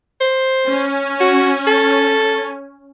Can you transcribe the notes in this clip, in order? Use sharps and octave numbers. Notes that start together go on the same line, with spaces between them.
C5
C#4
F#4
A4